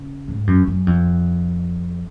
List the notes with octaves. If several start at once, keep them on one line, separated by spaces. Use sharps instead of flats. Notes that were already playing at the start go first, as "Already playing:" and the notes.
Already playing: C#3
G#2
F#2
F#2
F2